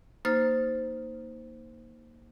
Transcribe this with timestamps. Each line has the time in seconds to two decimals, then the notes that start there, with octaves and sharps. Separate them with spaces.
0.25 A#3 D#4 C5 F6 A6